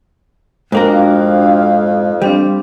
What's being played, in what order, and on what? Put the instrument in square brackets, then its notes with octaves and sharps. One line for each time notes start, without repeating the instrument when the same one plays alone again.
[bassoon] F2 [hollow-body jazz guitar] G#2 A#3 A#4 [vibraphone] D4 F#4 G5
[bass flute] F5
[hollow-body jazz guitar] G3 [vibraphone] C4 D4 F5 [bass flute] C5